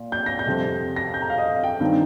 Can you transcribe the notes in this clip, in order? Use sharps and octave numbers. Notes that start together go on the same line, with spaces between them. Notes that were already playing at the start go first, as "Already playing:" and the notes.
Already playing: A#2
G6
A#6
G6
F2 C3 G3 C4
A#6
G6
A#5
F5
D#5
F5
G5
G2 D#3 C4 D#4 F5